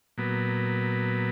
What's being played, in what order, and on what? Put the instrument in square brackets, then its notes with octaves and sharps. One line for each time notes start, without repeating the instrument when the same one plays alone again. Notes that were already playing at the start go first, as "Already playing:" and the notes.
[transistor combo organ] A#2 F#3 B3